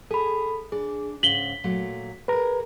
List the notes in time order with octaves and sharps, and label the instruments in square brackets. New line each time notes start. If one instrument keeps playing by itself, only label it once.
[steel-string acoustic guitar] G#4 [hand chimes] A4 B5
[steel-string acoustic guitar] D4 [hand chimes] G#4
[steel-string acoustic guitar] G#2 C#3 [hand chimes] B6 [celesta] F#7 G7
[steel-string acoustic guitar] A#2 F#3 A3
[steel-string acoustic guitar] G#4 A#4 [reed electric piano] B4 A#5